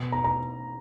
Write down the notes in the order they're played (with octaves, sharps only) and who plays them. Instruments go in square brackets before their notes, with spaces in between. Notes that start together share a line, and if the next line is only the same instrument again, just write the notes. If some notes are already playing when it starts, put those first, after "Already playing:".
Already playing: [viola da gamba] B2
[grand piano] A#5
A#5